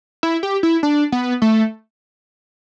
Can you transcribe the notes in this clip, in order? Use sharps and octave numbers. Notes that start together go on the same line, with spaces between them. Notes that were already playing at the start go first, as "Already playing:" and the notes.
E4
G4
E4
D4
B3
A3